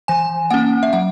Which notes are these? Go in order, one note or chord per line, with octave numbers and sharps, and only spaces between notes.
E3 G#5
A#3 C#4 F#5
E5
F#3 F#5